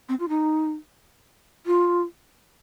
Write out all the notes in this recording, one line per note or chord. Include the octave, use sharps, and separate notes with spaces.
C4
F4
D#4
F4